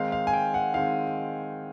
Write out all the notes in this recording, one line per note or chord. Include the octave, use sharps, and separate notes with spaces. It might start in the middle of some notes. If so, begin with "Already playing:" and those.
Already playing: D#3 G#3 C4 D#4 F5
F5
G#5
G5
F#5
D#3 G#3 C4 D#4 F5